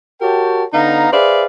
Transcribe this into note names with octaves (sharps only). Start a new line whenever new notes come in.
F#4 G4 A#4 C#5 G5 A5
D3 B3 D#4 F5 A#5
G#4 B4 C5 D5 E5 F5